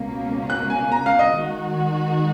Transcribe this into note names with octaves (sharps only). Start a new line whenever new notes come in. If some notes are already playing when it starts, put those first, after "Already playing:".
Already playing: C#2 B2 A#3 C#4
F#6
G#5
A#5
F5
D#5
D#3 G#3 D#4 F#4